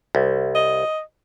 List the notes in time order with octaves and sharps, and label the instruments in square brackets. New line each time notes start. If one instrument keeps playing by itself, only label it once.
[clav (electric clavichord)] C2
[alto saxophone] D#5